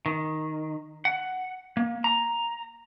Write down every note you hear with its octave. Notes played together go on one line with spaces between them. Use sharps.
D#3
F#5
A#3
A#5